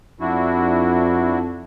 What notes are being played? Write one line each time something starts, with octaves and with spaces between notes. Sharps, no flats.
F2 D4 E4 F#4